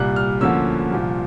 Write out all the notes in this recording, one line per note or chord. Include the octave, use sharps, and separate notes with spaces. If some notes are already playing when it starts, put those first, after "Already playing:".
Already playing: C2 A#2 G3 F#6
F6
D2 D3 F3 A#3 C#4 E6
C2 A#2 F3